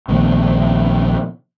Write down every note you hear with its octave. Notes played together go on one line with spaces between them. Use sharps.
A#1 D#3 A3 B3